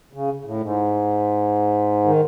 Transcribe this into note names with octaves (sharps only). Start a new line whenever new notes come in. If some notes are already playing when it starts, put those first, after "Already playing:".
C#3
A2
G#2
D#3